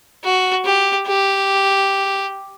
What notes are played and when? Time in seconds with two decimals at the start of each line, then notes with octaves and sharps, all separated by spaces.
0.24 F#4
0.65 G4
1.07 G4